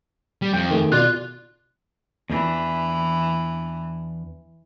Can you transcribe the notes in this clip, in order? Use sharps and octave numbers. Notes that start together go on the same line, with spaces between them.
G3
F2 G5
D#3 A3 G#4
B2 F4 D5 C6 F#6
E2 E3 D4